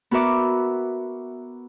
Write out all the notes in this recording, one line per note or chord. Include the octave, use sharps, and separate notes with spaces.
B3 F#4 A#4 E5 D6